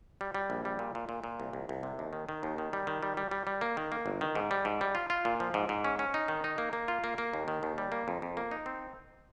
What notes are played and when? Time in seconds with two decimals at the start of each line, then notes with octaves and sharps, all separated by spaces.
0.21 G3
0.34 G3
0.50 A#1
0.65 G3
0.79 A#2
0.95 A#2
1.09 A#2
1.24 A#2
1.40 C2
1.53 C2
1.69 C2
1.83 C3
1.99 D#2
2.13 D#3
2.29 D#3
2.43 D#2
2.58 D#3
2.73 G3
2.87 D#3
3.03 G3
3.17 G3
3.31 G3
3.47 G3
3.61 A#3
3.77 D#3
3.92 A#3
4.06 G1
4.21 D#3
4.35 G#2
4.51 G3
4.65 G#2
4.81 G3
4.95 F4
5.10 F4
5.25 A#2
5.40 F3
5.54 G#2
5.69 G#2
5.84 C#4
5.99 C#4
6.14 D#4
6.28 D#3
6.44 D#4
6.58 A#3
6.73 A#3
6.88 F4
7.04 A#3
7.18 A#3
7.33 D#2
7.48 D#3
7.63 D#2
7.78 G3
7.92 A#3
8.08 F2
8.22 F2
8.37 A#3
8.51 D#4
8.66 C4